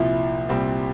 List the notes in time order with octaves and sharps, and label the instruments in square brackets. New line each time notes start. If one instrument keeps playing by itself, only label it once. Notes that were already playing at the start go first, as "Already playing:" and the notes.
Already playing: [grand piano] C2 A#2 F3 [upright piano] E4
[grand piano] C2 A#2 G3 C4